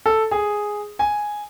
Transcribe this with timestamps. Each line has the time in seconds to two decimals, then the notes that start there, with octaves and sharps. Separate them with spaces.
0.06 A4
0.31 G#4
0.99 G#5